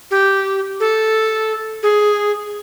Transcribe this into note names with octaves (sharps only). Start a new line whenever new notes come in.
G4
A4
G#4